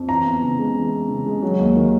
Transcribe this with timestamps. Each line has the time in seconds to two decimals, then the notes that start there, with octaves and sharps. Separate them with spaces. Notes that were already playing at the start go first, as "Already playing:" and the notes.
Already playing: F2
0.09 E3 A#5
0.26 E2
0.43 C#3
0.59 G#3
0.76 E3
0.92 E2
1.09 C#3
1.26 G#3
1.42 F#3
1.59 D#2
1.76 D#3